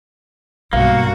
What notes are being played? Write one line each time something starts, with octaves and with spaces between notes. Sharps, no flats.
B1 G2 A#3 F#4 F5